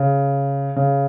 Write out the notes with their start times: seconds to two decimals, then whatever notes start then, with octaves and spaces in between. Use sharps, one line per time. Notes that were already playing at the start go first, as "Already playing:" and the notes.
Already playing: C#3
0.76 C#3